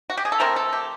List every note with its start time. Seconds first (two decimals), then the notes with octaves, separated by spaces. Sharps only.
0.10 F#4
0.17 G4
0.25 G#4
0.32 A4
0.40 C3 E3 A3 C4 A#4
0.56 A4
0.73 G4